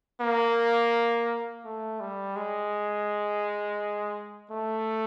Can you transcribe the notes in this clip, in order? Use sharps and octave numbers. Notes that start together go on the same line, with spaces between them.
A#3
A3
G3
G#3
A3